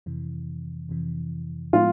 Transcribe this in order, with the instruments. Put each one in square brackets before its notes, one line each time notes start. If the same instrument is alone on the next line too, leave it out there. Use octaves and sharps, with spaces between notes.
[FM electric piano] F2 C3 E3
F2 C3 E3
[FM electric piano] A2 F3 G#3 B3 [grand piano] F4